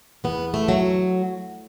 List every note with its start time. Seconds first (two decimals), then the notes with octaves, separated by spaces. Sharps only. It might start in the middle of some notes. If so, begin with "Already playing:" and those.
0.24 E2 B3
0.54 A3
0.68 F#3